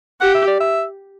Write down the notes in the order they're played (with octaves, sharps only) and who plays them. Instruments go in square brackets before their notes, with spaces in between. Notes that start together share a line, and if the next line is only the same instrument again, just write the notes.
[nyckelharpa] G4 [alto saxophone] F#5
[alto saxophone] E5
D5
E5